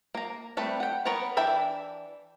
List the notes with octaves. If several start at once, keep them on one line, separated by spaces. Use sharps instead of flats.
A#3 A#5
G3 A3 C4 B4
F#5 G5
B3 A#4 B4 C#5 F#5
E3 D4 E5 G5 B5